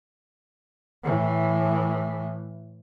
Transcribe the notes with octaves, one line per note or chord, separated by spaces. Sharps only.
A2 E3